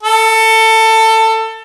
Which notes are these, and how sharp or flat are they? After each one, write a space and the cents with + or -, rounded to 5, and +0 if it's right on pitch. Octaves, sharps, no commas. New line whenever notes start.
A4 +20